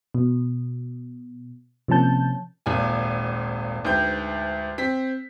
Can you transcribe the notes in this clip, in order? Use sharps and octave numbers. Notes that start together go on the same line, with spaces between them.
B2
C3 F3 A#3 C#4 A5 G6
D#1 G#1 A#2 G#5
D2 G#2 B4 G5 G6
C4 B6